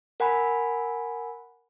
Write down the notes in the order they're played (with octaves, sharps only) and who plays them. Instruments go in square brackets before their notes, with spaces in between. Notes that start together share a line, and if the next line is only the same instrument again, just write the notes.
[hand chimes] A#4 F#5 G#5 B5